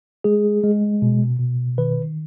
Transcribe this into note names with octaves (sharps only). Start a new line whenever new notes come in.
G#3 G#4
G#3
B2
B2
D#3 B4